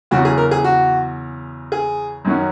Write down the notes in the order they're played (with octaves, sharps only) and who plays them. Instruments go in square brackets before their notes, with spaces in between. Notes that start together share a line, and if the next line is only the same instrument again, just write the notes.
[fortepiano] E2 C#3 F#3 F#4
G#4
A#4
G#4
F#4
G#4
F#2 D#3 F#3 C#4